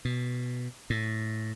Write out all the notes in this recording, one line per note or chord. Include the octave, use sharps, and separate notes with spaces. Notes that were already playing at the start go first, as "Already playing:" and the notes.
B2
A2